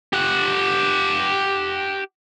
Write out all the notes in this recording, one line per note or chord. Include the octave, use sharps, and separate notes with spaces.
G4 F#5